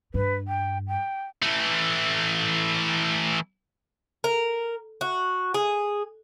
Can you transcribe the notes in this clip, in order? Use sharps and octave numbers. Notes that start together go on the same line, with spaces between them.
G2 B4
G5
G5
E3 A3
A#4
F#4
G#4